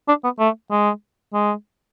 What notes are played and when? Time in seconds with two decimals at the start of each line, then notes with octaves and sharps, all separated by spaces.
0.08 D4
0.24 B3
0.39 A3
0.71 G#3
1.34 G#3